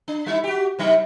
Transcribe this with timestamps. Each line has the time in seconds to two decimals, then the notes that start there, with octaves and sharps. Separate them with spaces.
0.08 D4
0.26 G3 D#4 E4
0.44 F#4 G4
0.79 C3 F#3 D#4